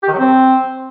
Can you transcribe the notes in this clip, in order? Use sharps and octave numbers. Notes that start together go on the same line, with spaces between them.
G4
D#3
F#3
C4